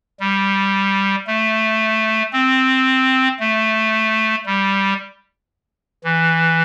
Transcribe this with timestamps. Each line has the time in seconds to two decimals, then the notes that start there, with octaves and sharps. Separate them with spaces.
0.20 G3
1.27 A3
2.33 C4
3.40 A3
4.46 G3
6.04 E3